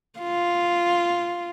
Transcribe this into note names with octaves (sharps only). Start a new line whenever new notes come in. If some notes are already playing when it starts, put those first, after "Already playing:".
F4